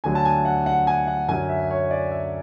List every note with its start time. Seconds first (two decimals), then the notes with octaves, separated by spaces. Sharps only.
0.04 D2 D3 F#3 G#5
0.15 A5
0.25 G#5
0.45 F#5
0.66 F#5
0.87 G#5
1.07 F#5
1.29 F#2 D3 F#3 G#5
1.49 E5
1.71 C#5
1.91 D5
2.12 E5